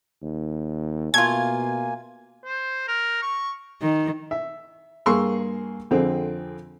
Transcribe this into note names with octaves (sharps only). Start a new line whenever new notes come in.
D#2
B2 A3 A#3 F4 G#5 G#6
C5
A#4
C#6
D#3
E5
G2 A#3 G#4 C6 C#6 E6
F2 D3 C4 G#4